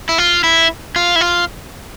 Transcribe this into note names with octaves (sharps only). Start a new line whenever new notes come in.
E4
F4
E4
F4
E4
F4